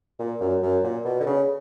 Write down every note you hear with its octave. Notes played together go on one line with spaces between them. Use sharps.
A#2
F#2
F#2
A#2
B2
D3
C#3